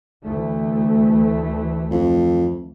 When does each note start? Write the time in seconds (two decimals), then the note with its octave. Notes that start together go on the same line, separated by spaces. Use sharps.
0.23 D2 E3 A3
1.91 F2